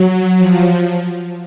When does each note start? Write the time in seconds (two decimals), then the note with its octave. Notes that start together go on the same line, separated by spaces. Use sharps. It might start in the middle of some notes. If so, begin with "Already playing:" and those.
Already playing: F#3
0.39 F3